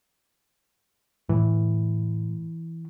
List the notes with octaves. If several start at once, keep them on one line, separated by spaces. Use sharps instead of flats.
A2 E3